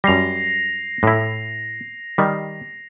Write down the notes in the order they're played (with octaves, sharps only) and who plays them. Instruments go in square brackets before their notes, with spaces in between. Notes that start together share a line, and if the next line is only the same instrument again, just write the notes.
[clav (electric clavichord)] F#2 G3 [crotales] A#6 C7 F7
[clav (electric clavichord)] A2 E4
D#3 G3